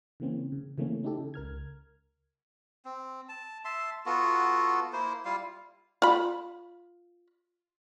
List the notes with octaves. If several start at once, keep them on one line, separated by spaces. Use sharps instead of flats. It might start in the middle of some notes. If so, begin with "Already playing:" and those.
C#3 E3 A#3 C4 C#4
C#3
C#3 E3 A3 A#3 C4 C#4
C#4 D#4 E4 G4 A4
C#3
C#2 A#4 F6 G#6
C4
A5
E5 A5 C6
B3 F4 F#4 A4
A#3 E4 C5
G3 E4 F4 F5
F4 B5